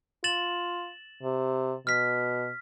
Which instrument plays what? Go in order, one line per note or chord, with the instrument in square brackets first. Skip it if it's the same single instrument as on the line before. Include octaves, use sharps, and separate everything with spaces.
[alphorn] F4 [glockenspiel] A6 E7 F#7
[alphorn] C3
[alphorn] B2 [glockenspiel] F6 B6